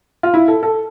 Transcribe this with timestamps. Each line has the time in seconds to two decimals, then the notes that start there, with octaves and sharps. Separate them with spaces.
0.23 F4
0.34 E4
0.48 A4
0.63 A4